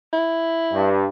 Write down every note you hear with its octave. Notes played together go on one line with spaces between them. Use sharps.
E4
G2